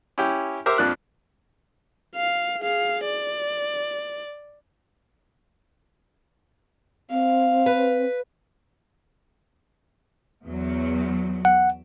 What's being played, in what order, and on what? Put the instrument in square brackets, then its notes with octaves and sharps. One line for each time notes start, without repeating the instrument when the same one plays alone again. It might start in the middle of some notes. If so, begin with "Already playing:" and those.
[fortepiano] C#4 E4 G4 G5
G4 A#4 C5 E5 D6
F2 F3 D4 F#6
[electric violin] F5
G#4 F5
D5
[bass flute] C4 [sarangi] F5
[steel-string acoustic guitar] B4
[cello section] E2 F#3
[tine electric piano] F#5